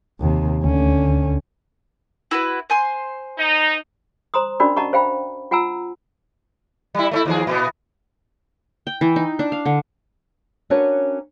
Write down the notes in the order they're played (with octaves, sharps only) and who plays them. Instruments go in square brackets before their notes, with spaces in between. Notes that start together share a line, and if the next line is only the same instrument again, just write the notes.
[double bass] D#2 C3
[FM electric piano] D2 [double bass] D3 C#4
[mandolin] E4 F#4 B4
C5 G#5 C6
[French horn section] D#4
[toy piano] C5 A#5 C6 D#6
C#4 D4 F#4 A#4 D5 B5
D#5 F#5 A5 A#5 C#6
C5 F5 G5 B5
F4 F#5 G#5 A#5 E6
[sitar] G3 E4
A3 C#4 E4
D#2 F3 G#4
A#2 B3
[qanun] G5
E3
D#4
D4
F5
D3
[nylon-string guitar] C#4 D4 F#4 A#4 B4 C#5